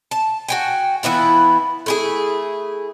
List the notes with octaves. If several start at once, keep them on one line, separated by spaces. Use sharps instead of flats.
A5
F#4 G5 G#5
E3 B3 E4 F4
A3 E4 G#4